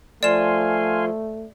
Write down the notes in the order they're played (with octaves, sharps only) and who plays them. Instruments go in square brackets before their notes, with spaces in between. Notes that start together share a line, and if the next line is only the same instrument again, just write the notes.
[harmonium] F3 [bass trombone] A3 [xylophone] D5 E7 [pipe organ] F5 G#5 C6